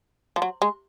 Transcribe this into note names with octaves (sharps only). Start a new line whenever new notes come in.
F3
F#3
G#3